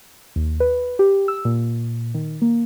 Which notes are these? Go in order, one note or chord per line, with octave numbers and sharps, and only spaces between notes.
D#2
B4
G4
E6
A#2
D#3
A#3